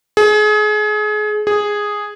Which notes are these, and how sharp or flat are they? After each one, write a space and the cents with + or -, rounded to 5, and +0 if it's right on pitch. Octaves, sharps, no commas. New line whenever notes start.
G#4 +30
G#4 -5